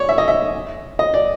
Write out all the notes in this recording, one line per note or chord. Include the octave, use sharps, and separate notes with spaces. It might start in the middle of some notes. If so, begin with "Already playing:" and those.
Already playing: C#5 D5
E5
D#5
E5
D#5
D5